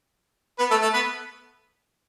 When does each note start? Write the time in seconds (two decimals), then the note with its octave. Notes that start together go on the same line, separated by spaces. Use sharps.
0.59 B3 B4
0.71 A3 A4
0.82 A3 A4
0.94 B3 B4